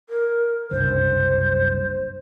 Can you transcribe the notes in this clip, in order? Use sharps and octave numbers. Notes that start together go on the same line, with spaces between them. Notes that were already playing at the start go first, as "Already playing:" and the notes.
A#4
F#1 C2 G2 C5